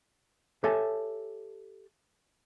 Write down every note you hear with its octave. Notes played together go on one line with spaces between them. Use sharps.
G4 A4 C#5 E5 G#5 A5